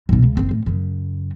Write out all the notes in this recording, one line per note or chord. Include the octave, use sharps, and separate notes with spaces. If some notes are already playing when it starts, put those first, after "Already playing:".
B1 B2
C#2
F#1 C4
A2
F#2 C#3